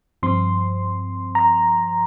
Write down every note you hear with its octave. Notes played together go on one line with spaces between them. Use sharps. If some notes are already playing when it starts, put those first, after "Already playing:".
G2 F3 C4 C6
A#5